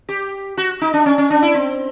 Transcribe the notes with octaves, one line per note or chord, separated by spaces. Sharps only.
G4
F#4
D#4
D4
C#4
C#4
D4
E4
C4